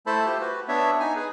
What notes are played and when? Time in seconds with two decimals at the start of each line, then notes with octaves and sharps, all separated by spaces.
0.06 A3 E4 A4 C5 A5 B5
0.26 F4 G4 C5
0.41 F#4 B4
0.68 B3 D4 C#5 E5
1.00 D#4 G#5
1.16 G#4 B4